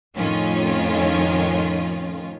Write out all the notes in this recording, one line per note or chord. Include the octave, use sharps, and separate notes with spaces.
F2 A2 D#3 F3 C#4 F4